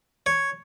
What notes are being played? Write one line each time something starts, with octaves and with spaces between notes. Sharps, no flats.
C#5